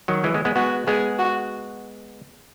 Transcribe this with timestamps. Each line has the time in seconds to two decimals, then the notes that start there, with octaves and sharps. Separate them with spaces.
0.08 D#3 F#3
0.24 E3 G#3
0.34 G#3 B3
0.45 G#3 B3
0.56 G#3 B3 F#4
0.87 G#3 B3 G#4
1.19 F#4